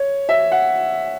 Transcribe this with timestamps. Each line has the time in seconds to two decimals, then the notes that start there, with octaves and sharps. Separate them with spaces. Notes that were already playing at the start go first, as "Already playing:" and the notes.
Already playing: C#5
0.29 E5
0.52 F#5